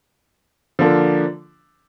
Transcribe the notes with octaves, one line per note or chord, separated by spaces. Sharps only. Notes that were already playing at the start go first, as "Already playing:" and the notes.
D3 F3 A#3 D4 A4